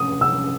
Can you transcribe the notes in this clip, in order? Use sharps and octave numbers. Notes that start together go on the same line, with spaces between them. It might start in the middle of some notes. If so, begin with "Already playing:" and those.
Already playing: D#6
E6